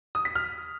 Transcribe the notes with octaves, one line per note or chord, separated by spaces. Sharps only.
D#6
B6
F6